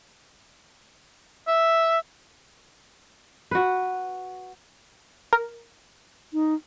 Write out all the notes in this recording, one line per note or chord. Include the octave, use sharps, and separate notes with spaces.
E5
F#4 B4
A#4
D#4